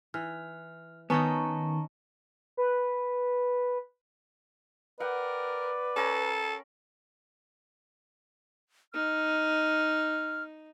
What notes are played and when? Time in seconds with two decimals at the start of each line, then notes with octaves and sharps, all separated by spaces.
0.14 E3 F6
1.10 D#3 B3 C#4 D#4 A5 A#5 C#6
2.57 B4
5.00 A#4 B4 D5 F#5 G5
5.96 C#4 A4 A#4 B5
8.94 D#4 F6